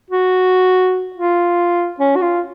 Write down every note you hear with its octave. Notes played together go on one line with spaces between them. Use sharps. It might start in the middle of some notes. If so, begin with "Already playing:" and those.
F#4
F4
C#4
F#4
F4